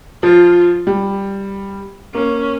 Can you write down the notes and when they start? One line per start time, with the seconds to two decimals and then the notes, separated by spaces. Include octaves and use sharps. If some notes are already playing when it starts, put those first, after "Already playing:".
0.23 F3 F4
0.87 G3
2.14 A#3 C#4